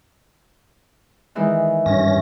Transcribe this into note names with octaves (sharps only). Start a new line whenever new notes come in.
D#3 E3 G#3
G2 C#4 A#6